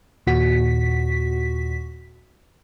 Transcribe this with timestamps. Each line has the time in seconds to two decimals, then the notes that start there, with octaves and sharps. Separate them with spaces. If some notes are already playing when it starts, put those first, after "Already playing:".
0.27 D#2 A#2 F#4 B6